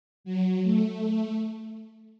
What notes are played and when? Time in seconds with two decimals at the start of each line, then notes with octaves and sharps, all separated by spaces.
0.24 F#3
0.63 A3